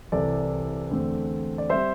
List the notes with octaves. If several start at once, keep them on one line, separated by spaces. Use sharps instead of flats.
C2 C3 E3 A4 D5
E2 D3 A3 C4
D5
G3 C4 C5 E5